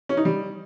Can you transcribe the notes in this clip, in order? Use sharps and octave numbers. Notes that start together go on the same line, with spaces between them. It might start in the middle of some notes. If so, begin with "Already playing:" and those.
C#4
D#4
G3